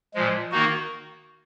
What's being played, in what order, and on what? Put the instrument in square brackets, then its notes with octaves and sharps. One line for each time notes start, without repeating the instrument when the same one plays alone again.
[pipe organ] A#2 F3 G#3
D#3 A#3 D#4 F#4